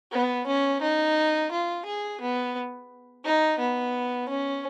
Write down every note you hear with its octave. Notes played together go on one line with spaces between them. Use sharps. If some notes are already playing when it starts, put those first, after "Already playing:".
B3
C#4
D#4
F4
G#4
B3
D#4
B3
C#4